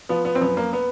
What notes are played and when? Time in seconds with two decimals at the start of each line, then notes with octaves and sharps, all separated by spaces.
0.09 F3 B3
0.25 B3
0.35 C4
0.41 F#2 B3
0.57 A#3
0.73 B3